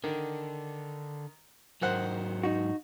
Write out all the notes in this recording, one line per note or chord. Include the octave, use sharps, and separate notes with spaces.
D3 D#3
G#2 D#3 F#3 C5 F#5
D#4 F#4